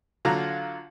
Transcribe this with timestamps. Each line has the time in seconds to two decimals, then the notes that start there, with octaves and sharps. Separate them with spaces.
0.25 D3 F#3 F4 A#5